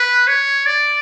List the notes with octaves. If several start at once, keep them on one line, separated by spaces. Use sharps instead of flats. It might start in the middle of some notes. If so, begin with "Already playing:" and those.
Already playing: B4
C#5
D5